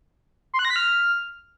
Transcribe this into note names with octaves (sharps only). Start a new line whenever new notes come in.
C6
F#6
A#6
B6
F6